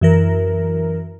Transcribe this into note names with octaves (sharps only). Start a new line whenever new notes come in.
F#2 E3 A#4